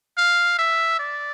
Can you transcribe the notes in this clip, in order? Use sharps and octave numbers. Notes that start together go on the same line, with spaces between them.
F5
E5
D5